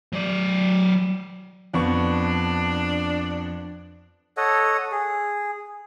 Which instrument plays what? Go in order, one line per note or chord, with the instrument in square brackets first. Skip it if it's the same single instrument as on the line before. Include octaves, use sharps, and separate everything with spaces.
[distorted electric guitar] F#3 D5
[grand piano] F2 B3 C#6 [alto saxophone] D4
[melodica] A4 C#5 D#5 F#5
G#4